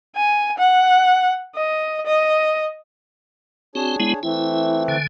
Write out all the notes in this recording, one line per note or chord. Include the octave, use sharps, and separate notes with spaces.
G#5
F#5
D#5
D#5
C4 D4 F#4 G#4 C#5
G#3 B3 E4
E3 A3 C4 E4
D3 G#5